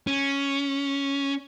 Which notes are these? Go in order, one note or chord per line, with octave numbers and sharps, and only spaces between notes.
C#4